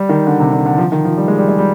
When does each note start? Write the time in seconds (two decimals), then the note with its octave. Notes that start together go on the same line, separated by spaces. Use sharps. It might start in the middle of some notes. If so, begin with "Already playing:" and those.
Already playing: G3
0.09 D#3
0.27 D3
0.40 C3
0.53 D3
0.66 D3
0.78 F3
0.92 D#3
1.05 F3
1.17 G3
1.28 G#3
1.38 G3
1.49 G#3
1.59 G3